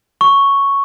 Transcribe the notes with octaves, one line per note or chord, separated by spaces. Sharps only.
C#6